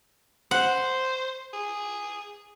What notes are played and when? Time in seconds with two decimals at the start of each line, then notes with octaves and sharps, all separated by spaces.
0.51 C5 F#5
1.53 G#4